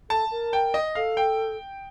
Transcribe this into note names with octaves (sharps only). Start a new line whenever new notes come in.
A4 A5
A#4
G5
D#5
A4 F5
G5